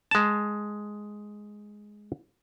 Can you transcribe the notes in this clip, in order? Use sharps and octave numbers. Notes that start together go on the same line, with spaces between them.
G#3 A5